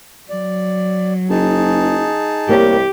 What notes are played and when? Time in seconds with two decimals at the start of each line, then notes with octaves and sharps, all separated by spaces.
0.30 F#3 D5
1.30 F#1 D#4 G#4 A5
2.49 C2 A#3 G4 C#5